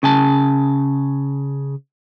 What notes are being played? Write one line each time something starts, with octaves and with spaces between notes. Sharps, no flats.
C#3 G#5 A5